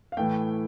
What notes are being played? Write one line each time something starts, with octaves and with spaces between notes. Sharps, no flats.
F5
A2 E3 A3 G5